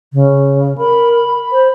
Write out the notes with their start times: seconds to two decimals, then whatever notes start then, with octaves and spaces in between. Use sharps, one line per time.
0.13 C#3
0.78 A#4 B5
1.52 C5